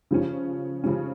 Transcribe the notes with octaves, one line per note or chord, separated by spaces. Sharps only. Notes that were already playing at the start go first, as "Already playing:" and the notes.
C#3 F3 C#4
C#3 F3 C#4